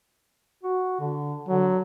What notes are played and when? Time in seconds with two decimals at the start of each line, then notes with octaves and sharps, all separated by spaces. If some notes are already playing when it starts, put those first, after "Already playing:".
0.64 F#4
1.00 D3
1.49 D3 F#3